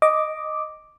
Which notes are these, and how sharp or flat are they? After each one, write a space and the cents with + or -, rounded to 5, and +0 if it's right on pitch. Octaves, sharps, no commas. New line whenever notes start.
D#5 +0 D6 +0